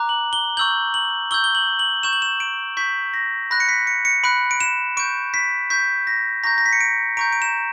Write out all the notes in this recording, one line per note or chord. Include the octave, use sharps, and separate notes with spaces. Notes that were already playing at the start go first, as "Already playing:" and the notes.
Already playing: A#5 D6 F#6
F#7
G7
C#6 E6 G6 F#7
F#7
C#6 E6 G6 G7
G7
F#7
F#7
C#6 G6 E7
F#7
E7
D7
C#6 G6 B6
A#6
B5 F#6 A#6
C#7
B6
C#7
C#7
B5 F#6 D7
D7
E7
C#6 G6 D7
B6
C#6 G6 B6
A#6
A#5 C#6 G6 A#6
A#6
B6
C#7
D7
A#5 C#6 G6 D7
D7
E7